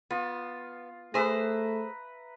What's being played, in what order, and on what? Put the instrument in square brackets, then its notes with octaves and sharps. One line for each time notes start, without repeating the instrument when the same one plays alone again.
[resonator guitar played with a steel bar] B3 [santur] F4
[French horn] A3 [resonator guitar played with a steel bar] G#4 C5 [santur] B4 E5 A#5